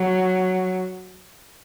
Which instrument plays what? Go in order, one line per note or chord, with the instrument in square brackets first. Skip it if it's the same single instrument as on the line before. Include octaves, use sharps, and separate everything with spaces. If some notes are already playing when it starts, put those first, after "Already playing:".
Already playing: [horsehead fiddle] F#3